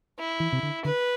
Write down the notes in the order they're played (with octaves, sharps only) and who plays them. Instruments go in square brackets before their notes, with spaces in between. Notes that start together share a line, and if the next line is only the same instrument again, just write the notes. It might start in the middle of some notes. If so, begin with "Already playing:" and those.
[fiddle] E4
[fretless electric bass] E3
C3
D3
[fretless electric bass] D3 [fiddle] B4